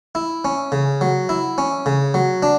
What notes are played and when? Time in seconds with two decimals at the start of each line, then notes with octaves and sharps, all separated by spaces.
0.15 E4
0.45 C#4
0.72 C#3
1.01 F#3
1.29 E4
1.58 C#4
1.86 C#3
2.14 F#3
2.43 D4